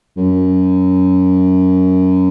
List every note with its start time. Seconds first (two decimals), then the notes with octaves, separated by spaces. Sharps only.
0.17 F#2